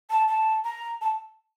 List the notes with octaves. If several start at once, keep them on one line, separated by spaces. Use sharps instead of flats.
A5
A5
A#5
A5